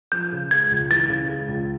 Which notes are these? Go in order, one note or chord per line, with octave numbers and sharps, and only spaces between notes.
F3 G6
C#3
G#3 G#6
C#2
E3 A6
C#3
G#3
C#2